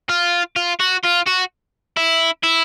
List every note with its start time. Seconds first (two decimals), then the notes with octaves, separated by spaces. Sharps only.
0.09 F4
0.56 F4
0.80 F#4
1.04 F4
1.26 F#4
1.97 E4
2.44 E4